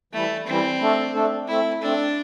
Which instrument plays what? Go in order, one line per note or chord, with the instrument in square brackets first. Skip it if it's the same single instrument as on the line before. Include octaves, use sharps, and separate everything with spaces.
[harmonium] E3 G3 E4 [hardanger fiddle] A3
[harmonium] E3 G3 E4 [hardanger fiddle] C4
[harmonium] A3 D4 A4
A3 D4 A4
[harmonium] A3 C4 A4 [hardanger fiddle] E4
[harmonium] A3 C4 A4 [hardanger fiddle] D4